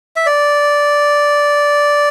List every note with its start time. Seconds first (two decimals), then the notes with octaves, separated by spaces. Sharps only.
0.16 E5
0.26 D5